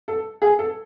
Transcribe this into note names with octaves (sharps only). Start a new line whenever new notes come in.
A4
G#4
A4